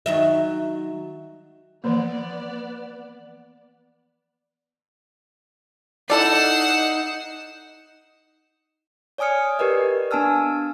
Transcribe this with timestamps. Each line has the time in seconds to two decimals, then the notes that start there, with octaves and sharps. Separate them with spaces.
0.06 D#3 F#3 E5
1.84 E3 F3 A#3 B3 D5
6.10 D#4 E4 A4 D5 F#5 C7 E7
9.18 C#5 D5 G#5 D#6 F6 C#7
9.59 G4 A#4 B4 D5 D#5
10.11 B3 D4 G#5 A5 E6 F6